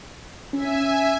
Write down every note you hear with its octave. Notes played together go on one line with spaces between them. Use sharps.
C#4 E5 G#5